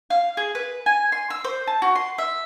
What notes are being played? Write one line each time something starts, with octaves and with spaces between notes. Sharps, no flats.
F5
G#4
B4
G#5
C6
E6
C5
A5
F#4
C6
E5